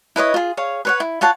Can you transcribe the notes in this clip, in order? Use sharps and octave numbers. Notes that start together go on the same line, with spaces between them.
E4 B4 C#5 D#5
F4 G#4
G#4 C#5 F5
B4 C#5 F#5
E4
F4 C#5 F#5 A5